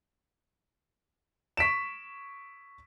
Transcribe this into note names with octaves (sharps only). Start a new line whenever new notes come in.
C#6 B6 D7 E7